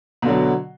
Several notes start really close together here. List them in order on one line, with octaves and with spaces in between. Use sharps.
B2 D3 F#3